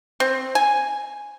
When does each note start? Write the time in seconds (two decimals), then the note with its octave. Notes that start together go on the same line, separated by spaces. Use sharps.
0.20 C4
0.55 G#5